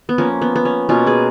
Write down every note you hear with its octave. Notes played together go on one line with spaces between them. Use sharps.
B3
F3 A#3 C#4
B3
B3
C#4
B2 A#3 C#4 F4
G#4 B4